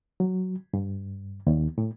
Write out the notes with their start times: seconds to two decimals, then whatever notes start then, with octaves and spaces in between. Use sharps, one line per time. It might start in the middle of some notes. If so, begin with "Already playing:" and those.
0.20 F#3
0.74 G2
1.47 D#2
1.78 A2